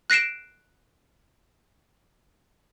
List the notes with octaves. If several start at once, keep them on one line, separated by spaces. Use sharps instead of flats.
F#6 A#6 C7 D7 E7